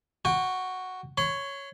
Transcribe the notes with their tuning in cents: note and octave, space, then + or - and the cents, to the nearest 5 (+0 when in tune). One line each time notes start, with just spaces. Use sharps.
F#4 +0 G5 +35
C#5 +0 C6 -40